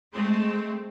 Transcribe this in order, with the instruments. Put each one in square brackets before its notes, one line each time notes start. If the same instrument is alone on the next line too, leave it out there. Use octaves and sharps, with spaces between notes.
[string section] G#3 A3 C4